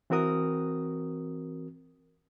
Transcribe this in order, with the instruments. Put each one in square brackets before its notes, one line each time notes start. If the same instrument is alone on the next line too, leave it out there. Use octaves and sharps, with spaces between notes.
[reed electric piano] E3 C4 F#4 A#4 D#6